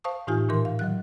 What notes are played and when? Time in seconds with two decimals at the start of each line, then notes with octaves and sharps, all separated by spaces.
0.04 C5 F5 A5 C#6 D#6
0.27 A2 E3 D#4 F4 G4 G#5
0.49 A#2 D#3 E3 A#4 C6
0.65 F5
0.79 D#3 F#3 F#6